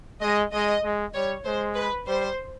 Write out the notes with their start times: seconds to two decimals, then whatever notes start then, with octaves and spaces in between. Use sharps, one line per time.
0.22 G#3 D#5
0.53 G#3 D#5
0.84 G#3
1.14 G3 C#5
1.45 G#3 C5
1.76 B4
2.07 G3 C5